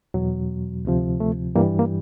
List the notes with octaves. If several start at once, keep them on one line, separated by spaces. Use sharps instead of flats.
E2 B2 F#3
D2 C3 F3
A3
G2 E3 G3 A#3
A#3